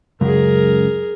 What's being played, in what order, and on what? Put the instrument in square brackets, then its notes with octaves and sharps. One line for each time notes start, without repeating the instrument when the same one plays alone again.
[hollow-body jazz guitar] C#2 F#2 [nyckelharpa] G#4 A#4